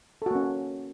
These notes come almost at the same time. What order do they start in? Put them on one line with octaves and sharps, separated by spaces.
A4 F#4 A#3 C#4